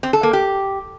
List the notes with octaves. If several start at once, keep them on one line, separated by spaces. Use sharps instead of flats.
C4
A4
A#3
G4